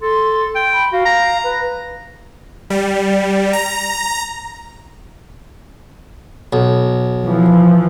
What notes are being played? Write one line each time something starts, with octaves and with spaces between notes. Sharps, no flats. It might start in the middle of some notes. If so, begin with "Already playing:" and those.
A4 C6
G5
B5
F#4 F5
A#5
B4
G3
A#5
B1
E3 F3